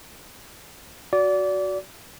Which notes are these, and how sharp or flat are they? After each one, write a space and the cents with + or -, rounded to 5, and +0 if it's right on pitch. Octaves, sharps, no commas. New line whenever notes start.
F#4 +0 D5 -25